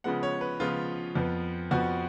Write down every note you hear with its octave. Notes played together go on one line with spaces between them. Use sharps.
C#3 F3 G#3 B3 F#5
C#5
B4
C#3 F3 G#3 B3 F4
F2 F3 B3
F2 F3 B3 F#4